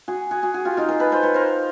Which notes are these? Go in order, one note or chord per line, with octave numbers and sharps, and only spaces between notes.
F#4 G#4
F#4 G#4
F#4 G#4
F#4 G#4
F4 G4
D#4 F4
G#4 A#4
A4 B4
A#4 C5
B4 C#5
A#4 C5